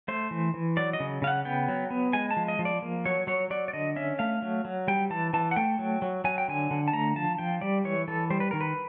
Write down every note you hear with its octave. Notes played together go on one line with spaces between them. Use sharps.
A3 C5
E3
E3
F#3 D5
D#5
C#3
C#3 F5
F#5
B3 G5
F#3
B3
G#3 G#5
A5
F3
D#5
F3
D5
A#3
F#3 C#5
F#3 C#5
F#3 D5
D5
D3 D#5
C#4 E5
A3 F5
F#3
F#3
G3 G5
E3 A5
E3 A5
F#5
A3 G5
F#3
F#3
F#3 G#5
G5
D3 G#5
D3
A5
A3 A#5
F3 A5
F3 G5
G3 D5
E3 C#5
E3 A4
G3 C5
B4
D#3 A#4
B4